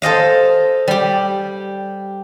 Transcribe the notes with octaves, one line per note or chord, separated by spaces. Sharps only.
A4 C5 D#5 F5
G3 G4